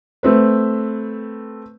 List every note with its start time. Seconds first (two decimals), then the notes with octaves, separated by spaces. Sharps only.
0.23 A3 C4 B4